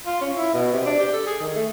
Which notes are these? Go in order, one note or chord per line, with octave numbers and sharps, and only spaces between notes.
F4
C#4
E4
B2
C3
D4
G4
A4
G#4
D#3
A3